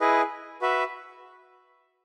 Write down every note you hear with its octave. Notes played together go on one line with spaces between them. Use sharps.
E4 G#4 B4 D#5
F#4 B4 E5